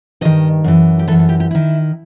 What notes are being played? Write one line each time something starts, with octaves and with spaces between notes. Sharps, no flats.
G2 D#3 D#5
F#2 E3
G4
F#2 E3 A4
A4
G4
G4
D#3 E4